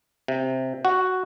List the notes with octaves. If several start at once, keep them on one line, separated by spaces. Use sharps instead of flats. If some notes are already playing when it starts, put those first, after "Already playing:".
C3
F#4